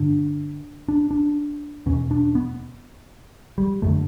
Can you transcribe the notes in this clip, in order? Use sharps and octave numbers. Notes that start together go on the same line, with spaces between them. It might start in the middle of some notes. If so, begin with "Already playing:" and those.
Already playing: G2 D3 D4
D4
D4
E2 B2 C#4
D4
B3
G3
F#2 D3 A3